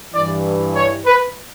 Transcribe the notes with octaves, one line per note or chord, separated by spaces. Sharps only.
G2 E3 D5
C#5
B4